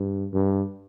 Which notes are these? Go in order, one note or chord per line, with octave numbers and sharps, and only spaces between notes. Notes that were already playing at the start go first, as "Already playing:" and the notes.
Already playing: G2
G2